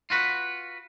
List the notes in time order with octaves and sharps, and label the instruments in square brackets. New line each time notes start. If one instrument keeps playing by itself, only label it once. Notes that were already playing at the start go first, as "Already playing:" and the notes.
[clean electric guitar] F4 F#4 B4